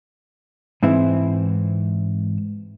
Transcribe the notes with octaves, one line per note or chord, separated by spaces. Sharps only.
G#2 E3 C4 E4